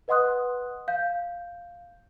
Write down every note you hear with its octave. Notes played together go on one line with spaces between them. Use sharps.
B4 D#5 F#5 C6 D#6 F#6
F5 G6